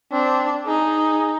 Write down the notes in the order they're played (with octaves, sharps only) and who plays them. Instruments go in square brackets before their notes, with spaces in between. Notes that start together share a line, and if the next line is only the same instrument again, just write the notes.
[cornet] C4 [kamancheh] D4
[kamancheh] D#4 [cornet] G#4